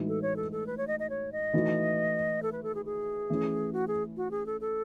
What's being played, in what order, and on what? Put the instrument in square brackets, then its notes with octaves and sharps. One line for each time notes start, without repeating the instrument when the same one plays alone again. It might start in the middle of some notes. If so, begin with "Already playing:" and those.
Already playing: [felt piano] A2 E3 G#3 D#4 F#4
[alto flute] A4
C#5
A4
A4
B4
C#5
D#5
D#5
C#5
D#5
[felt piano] E3 A3 D#4 F#4
[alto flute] A4
B4
A4
G#4
G#4
[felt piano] E3 A3 C#4 E4
[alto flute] F#4
G#4
F#4
G#4
A4
A4